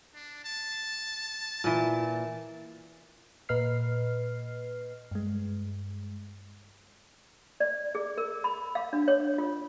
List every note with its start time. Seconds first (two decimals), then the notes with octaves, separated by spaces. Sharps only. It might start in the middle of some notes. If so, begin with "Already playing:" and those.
0.14 D4
0.44 A5
1.64 A#2 E3
3.49 A#2 B4 D#5 F6 C7
5.11 G2 G#3
7.60 D5
7.95 G#4
8.18 A#4
8.44 B5
8.75 F5
8.93 D4
9.08 C#5
9.38 F4